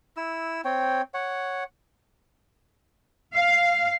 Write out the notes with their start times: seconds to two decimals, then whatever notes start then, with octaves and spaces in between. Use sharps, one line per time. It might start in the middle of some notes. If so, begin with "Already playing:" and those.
0.17 E4 E6
0.65 C4 C#5 G5
1.14 C#5 F#5
3.35 F5